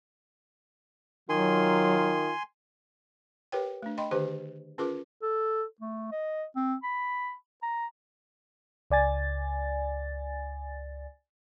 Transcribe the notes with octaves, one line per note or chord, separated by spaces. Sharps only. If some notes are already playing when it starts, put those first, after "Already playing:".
D#3 F#3 F4 G#5 C6
G4 A#4 B4 C#5 G5
A3 D4
D#5 G5 B5 C6
D3 D#3 D4 G4 B4 C5
C#4 F4 G#4 A#4 B4 D6
A4
A3
D#5
C4
B5
A#5
C#2 D5 G#5 A6